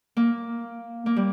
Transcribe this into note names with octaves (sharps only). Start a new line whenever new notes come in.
A#3
A#3
G3